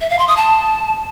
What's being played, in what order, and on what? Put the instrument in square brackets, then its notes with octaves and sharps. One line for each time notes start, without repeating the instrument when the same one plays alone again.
[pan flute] E5
F5
C6
D#6
A5